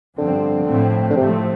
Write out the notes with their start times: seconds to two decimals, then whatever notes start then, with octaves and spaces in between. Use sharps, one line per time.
0.18 G2 D3 F3 C4
0.67 A2 F3 A3 C4
1.10 D3
1.16 A2 C3 F3 A3 C4